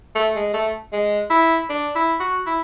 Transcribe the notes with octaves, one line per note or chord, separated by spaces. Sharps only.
A3
G#3
A3
G#3
E4
D4
E4
F#4
E4